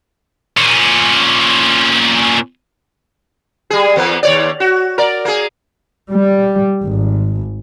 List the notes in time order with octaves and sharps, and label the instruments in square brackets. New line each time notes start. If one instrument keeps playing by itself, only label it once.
[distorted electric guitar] A#2 C#4
[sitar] G3 G#4
E2 A#3 B3
D#2 C#5 D5
F#4
A#4 D5
A#3 G#4
[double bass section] G3
G#1